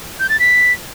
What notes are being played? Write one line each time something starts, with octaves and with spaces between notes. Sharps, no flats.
G6
A6
B6